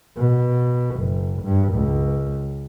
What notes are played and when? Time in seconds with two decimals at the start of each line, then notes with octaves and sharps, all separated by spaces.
0.17 B2
0.97 F#1
1.42 G2
1.74 C#2